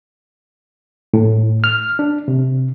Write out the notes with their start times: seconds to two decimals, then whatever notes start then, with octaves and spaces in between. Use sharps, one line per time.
1.14 A2
1.64 F6
1.99 D4
2.28 C3